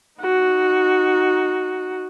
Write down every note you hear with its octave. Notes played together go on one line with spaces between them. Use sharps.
D#4 F#4